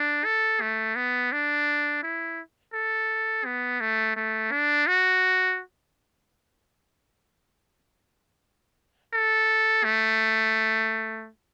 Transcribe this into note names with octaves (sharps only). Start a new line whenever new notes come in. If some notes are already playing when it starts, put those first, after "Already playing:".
Already playing: D4
A4
A3
B3
D4
E4
A4
B3
A3
A3
D4
F#4
A4
A3